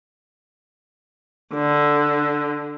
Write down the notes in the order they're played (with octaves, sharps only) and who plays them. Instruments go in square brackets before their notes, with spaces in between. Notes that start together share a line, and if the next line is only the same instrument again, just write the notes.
[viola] D3